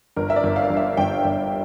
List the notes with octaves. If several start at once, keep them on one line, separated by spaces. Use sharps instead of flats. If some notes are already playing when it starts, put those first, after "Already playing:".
G1 A#4
E5
D5
G1
F5
G2
E5
G1 G5
G1